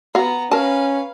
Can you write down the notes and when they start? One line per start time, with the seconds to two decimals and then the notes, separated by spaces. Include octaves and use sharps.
0.15 B3 F#4 F5 A#5
0.51 C#4 A#4 B4 F5 A5